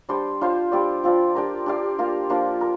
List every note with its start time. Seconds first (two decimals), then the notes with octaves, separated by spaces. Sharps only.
0.09 G3 D4 G4 C5
0.41 D4 F4 C5 F5
0.72 G3 C4 G4 D5
1.04 F3 C4 F4 D5
1.35 D4 G4 A#4
1.66 D4 G4 D5 F5
1.98 A#3 F4 A#4 F5
2.30 F3 A#3 D4 F4
2.61 A#4